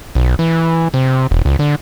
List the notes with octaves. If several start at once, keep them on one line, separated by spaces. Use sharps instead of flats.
B1
E3
C3
E1
C#2
D3